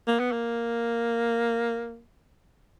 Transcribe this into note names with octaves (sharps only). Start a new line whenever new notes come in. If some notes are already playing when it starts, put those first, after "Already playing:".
A#3
B3
A#3